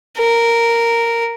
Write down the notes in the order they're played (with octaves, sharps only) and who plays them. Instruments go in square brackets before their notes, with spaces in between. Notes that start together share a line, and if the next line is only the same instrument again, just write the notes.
[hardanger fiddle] A#4